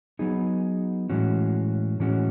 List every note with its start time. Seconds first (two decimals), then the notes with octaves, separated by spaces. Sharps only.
0.19 F#3 B3 D#4 G#4
1.09 A2 E3 G#3 C#4 F#4
2.00 A2 E3 G#3 C#4 F#4